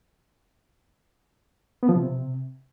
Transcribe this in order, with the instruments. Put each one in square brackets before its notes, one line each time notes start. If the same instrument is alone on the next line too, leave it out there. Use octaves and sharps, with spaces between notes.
[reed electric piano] B3
F3
C3